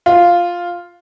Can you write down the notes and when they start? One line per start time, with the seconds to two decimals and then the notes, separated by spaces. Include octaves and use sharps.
0.06 F4